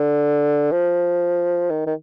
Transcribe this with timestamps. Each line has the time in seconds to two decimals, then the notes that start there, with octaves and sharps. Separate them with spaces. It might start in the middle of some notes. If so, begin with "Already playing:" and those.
Already playing: D3
0.71 F3
1.70 D#3
1.86 D#3